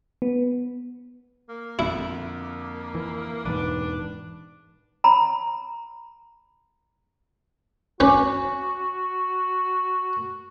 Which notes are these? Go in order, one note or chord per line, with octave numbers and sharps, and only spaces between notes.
B3
A#3
F2 D3 E4
E3
E1 E2 G#2 D4 B4
A#5 B5
C#4 F#4 B4 G#5 D6